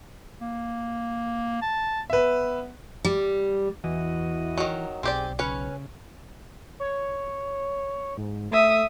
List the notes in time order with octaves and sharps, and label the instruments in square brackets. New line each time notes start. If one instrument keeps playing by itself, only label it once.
[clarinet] A#3
A5
[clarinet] B3 [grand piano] B4 E5
[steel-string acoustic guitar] G3
[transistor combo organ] E2 F#4 D#5 [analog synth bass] E3
[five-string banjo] D#3 F#3
[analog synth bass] B1 [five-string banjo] C4 G4 D5 [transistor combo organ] G#4
[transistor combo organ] C#3 [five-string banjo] C#4 B4 C#5
[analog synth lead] C#5
G#2
[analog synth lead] A3 [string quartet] E5 D#6